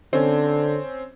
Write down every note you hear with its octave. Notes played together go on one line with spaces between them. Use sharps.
D3 C4 C#4